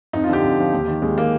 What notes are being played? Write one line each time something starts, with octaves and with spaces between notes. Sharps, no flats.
F2 D#4
F4
D3 F3 G4
F2
D3 F3
D#2
D#3
D#2 G#3
D#3 A#3